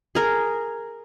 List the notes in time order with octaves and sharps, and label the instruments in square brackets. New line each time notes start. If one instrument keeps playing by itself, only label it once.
[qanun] G#4 A#4